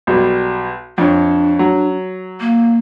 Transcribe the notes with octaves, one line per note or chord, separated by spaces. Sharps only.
B1 B2 G3
F2 D4 C#5
F#3
A#3